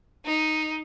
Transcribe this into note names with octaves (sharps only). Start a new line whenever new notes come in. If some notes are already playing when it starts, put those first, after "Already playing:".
D#4